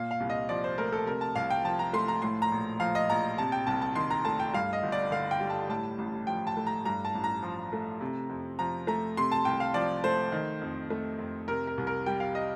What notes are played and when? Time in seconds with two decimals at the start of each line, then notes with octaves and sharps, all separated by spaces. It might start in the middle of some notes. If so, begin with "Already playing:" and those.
Already playing: A#2 F5
0.11 F5
0.20 C2
0.30 D#5
0.49 F3 D5
0.64 C5
0.78 A3 A#4
0.93 A4
1.06 C3 A#4
1.21 A5
1.35 C2 F5
1.50 G5
1.64 F3 A5
1.79 A#5
1.93 A3 C6
2.08 A#5
2.22 A2 C6
2.42 A#5
2.52 A#1
2.80 F3 F5
2.95 D#5
3.10 A#1 A#5
3.38 C3 A5
3.52 G5
3.67 C2 A5
3.82 A5
3.96 D#3 C6
4.10 A#5
4.25 A3 A5
4.40 G5
4.53 G2 F5
4.73 D#5
4.83 G1
4.92 D5
5.11 D3 F5
5.31 G5
5.40 G3
5.50 A5
5.69 A2 A5
5.98 A1
6.27 F3 G5
6.47 A5
6.57 A3
6.67 A#5
6.85 G2 A#5
7.05 A5
7.15 A1
7.24 A#5
7.43 F3
7.73 A3
8.01 C3
8.29 F2
8.59 F3 A#5
8.87 A3 A#5
9.17 C3 C6
9.32 A5
9.45 C2 G5
9.60 F5
9.74 F3 D5
10.04 A3 C5
10.32 D#3
10.61 F2
10.90 A3
11.19 F2
11.48 C3 A#4
11.67 A#4
11.78 C2
11.87 A#4
12.06 G3 G5
12.20 F5
12.35 D#5